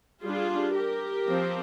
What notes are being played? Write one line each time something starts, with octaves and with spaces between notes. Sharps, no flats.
G3 D4 F4 G#4
G4 A#4
F3 C4